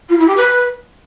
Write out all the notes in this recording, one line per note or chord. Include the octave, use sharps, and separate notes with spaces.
F4
E4
G4
B4